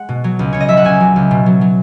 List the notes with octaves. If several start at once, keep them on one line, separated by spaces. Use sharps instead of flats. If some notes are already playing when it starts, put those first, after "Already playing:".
Already playing: G#3 F#5
B2
F#3
C#2
C#2 C#5
D#5
F#3 E5
F#5
C#2 G#5
F#3
C#2
B2
F#3
F#3